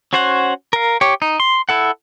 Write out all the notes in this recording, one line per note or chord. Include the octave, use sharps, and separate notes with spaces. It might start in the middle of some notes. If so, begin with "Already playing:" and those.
C#4 F#4 C5 C#5 F#5
A#4 F5
G4 C#5
D#4
C6
E4 A4 F#5